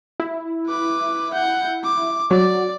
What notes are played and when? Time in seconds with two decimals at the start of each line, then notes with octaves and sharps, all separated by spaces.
0.20 E4
0.67 B4 D6
1.33 F#5 G6
1.83 D6
2.31 F#3 D5